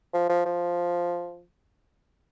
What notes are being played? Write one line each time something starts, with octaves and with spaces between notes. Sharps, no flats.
F3
F3
F3